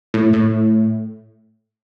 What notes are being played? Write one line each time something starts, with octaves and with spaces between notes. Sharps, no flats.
A2
A2